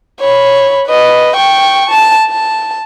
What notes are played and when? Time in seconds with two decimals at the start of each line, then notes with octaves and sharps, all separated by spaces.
0.21 C#5 B5
0.87 B4 D#5
1.36 G5 C#6
1.90 A5
2.28 A5